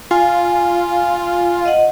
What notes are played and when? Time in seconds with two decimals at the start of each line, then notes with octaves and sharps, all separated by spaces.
0.11 F4 G#5
1.66 D#5 F#5